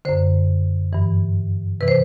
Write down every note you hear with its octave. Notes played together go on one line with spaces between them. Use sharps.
F#2 D3 C5
G2 E3
C3 E3 B4
C5